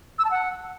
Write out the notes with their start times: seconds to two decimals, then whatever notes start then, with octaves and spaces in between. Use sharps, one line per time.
0.19 E6
0.25 A5
0.31 F#5